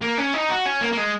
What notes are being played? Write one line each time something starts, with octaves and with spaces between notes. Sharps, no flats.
A#3
C#4
D#4
F#4
C#4
A#3
A#3
G#3